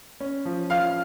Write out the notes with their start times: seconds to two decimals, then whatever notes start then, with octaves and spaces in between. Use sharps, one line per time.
0.20 C#4
0.45 F3
0.70 F3 F5 F6